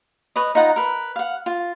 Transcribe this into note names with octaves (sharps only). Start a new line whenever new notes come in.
B4 C#5 D#5
D#4 F4 F#5 A#5
A#4 B4
F5 F#5
F4